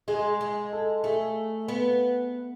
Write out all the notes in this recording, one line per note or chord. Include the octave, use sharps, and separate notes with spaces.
G#3 G#4
G#3
A4
A3 G#4
B3